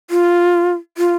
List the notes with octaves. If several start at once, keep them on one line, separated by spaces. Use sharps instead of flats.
F4
F4